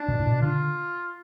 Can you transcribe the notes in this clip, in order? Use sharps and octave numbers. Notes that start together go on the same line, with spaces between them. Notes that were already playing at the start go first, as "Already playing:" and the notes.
Already playing: D4
B2
A2
B2
D3 F4